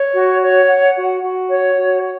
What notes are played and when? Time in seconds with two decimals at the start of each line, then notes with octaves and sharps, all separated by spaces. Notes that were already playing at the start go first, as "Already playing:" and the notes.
Already playing: C#5
0.14 F#4
0.42 C#5
0.68 F#5
0.95 F#4
1.23 F#4
1.50 C#5
1.76 F#4
2.03 C#5